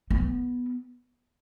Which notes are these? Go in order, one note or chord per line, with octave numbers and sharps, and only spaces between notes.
B3